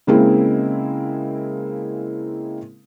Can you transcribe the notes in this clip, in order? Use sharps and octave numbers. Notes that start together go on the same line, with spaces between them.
C#3 G#3 A#3 C4 E4 G#4